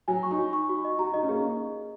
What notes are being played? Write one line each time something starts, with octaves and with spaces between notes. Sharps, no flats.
F#3 G#5
C#6
D#4
F#4
C#6
F#4
D#5
F#4 A#5
D#4 D#5
C#4
A#3 G#4